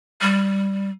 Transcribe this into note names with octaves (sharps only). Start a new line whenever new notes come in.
G3